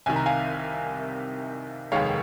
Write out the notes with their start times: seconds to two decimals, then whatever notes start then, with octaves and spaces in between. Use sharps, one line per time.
0.06 C2 C3 D#3 G#5
0.16 A#5
0.26 F5 G#5
1.92 F1 D#2 D#3 G#3 C#5 F5